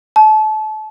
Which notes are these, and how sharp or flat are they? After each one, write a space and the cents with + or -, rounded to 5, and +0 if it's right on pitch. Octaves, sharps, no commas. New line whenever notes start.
A5 -30